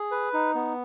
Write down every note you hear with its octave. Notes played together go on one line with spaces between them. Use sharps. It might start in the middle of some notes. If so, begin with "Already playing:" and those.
Already playing: G#4
B4
D#4
B3